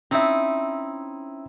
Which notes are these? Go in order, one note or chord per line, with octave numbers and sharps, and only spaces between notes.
C4 C#4 D#4 E4 E5